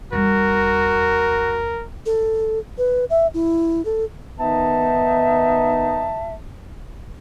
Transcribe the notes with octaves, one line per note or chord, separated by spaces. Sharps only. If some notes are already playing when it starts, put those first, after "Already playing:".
E2 G3 F#4 A#4
A4
B4
E5
E4
A4
D#3 B3 D#4 E5 A5